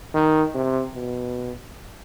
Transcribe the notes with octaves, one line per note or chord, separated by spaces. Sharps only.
D#3
C3
B2